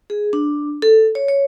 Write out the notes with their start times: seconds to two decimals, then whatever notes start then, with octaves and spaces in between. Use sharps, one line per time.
0.10 G#4
0.33 D4
0.82 A4
1.15 C#5
1.28 C#5